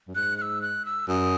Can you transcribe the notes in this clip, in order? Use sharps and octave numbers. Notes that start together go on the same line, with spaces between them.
F#2
G#2 F#6
F#6
E6
F#6
E6
F#2 D#6